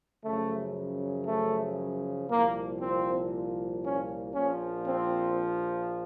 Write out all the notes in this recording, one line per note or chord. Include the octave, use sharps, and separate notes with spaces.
F#2 C#3 F3 A3
A3
C2 A#2 F3 A#3
C4
C#4
A#1 A#2 F3 C#4
C4